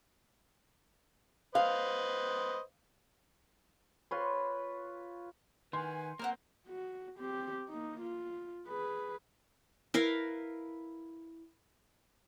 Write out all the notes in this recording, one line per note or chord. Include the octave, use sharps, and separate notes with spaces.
B4 C5 D#5 F5
F4 B4 C#5 C6
D#3 B4 F#5 G#5 C6
A#3 C4 A#4 C5 F#5
F#4
C4 G4
A#3 D#4
F4
G#4 B4
E4 A#4 B4 F5